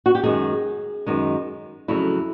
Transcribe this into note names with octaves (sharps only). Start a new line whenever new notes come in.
F#4
G4
F#2 D#3 G#3 G#4
F#2 D#3 G#3
F2 C#3 F#3 A3 E4